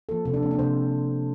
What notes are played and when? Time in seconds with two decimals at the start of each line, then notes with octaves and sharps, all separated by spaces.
0.09 F3 A#3 A4
0.25 C3 A4
0.34 D4
0.43 F3 A#3 C4
0.51 D4
0.59 C3 C5